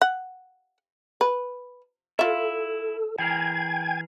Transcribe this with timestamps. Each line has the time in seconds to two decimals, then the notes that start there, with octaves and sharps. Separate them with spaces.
0.02 F#5
1.21 B4
2.19 E4 F4 A4 E5
3.18 E3 G#4 A#4 G5 G#5 G#6